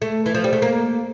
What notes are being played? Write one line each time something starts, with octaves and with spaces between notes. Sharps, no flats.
A3
E3
F3
G3
A3
A#3